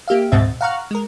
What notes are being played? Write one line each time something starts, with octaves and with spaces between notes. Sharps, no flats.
A#3 G4 E5 F5
D2 G#2 B2 C4 E5 A6
F5 F#5 A#5 C#6 F6 F#6
G#3 A#4